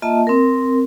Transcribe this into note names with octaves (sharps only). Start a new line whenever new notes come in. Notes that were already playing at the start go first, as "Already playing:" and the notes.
A#3 F4 D#5 E5 A5
C4 A#4